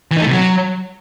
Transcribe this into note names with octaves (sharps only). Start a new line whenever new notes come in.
E3
D#4
A3
C3
F#3